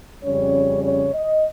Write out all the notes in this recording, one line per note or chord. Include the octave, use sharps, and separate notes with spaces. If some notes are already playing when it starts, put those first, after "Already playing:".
F2 C#3 G3 C#4 C#5
C#5
D#5